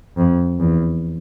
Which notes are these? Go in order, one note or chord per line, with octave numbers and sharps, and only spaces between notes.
F2
E2